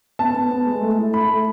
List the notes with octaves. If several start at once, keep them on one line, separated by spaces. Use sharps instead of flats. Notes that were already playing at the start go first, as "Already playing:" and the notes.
B3 A5
B3
B3
G#3
A3
E4
E4 B5
A3